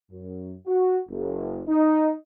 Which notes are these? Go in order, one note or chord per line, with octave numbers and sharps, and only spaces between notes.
F#2
F#4
F#1
D#4